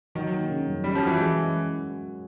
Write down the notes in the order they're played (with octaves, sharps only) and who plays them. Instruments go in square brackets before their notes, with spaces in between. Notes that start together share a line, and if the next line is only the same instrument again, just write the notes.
[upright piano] D#3 [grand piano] F#3
[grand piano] A#3
C#3
F#2
[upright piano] G3 [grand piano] C#4
[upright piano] F3
[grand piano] F#4
[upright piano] E3
[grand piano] G#3